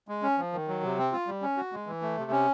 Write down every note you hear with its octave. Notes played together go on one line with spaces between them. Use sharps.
G#3
C#4
F3
D#3
F#3
C3
C4
F4
G3
C#4
F#4
G#3
E3
A3
C3
C#4